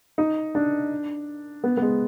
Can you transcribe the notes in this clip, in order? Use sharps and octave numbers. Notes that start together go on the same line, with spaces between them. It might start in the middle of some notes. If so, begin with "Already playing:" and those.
D#4
D4
B3
B3
G#3